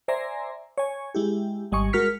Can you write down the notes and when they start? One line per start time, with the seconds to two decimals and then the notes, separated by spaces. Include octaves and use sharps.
0.08 C5 D5 E5 G#5 A#5 C6
0.78 C#5 G#5
1.15 G#3 E4 G4
1.72 G#1 G3 D#5 G#5 C#6
1.93 G#3 F#4 A#4 F6 B6 C#7